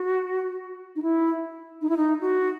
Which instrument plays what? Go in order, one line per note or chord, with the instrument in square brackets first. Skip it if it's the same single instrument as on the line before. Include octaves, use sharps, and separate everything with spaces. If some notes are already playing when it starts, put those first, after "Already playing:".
Already playing: [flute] F#4
D#4
E4
D#4
E4
D#4
F#4